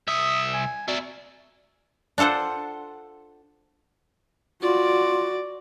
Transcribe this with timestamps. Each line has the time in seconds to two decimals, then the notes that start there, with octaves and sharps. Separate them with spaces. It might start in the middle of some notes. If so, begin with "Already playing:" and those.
0.08 C2 E5 D#6
0.54 G#5
0.88 E4 F#4 D5
2.18 D4 F4 A4 C5 F#5
4.62 F4 F#4 D5